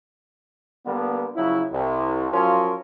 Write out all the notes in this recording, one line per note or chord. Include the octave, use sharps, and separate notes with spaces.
D3 G3 A#3 B3
C#3 F3 F#3 E4
C2
F3 F#3 C#4 F4 A#4